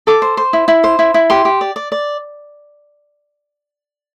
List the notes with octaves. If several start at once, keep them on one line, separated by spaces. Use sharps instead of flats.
A4 D6
C5
C5
E4
E4
C5
E4
E4
G4 C6
G4
D5
D5
D5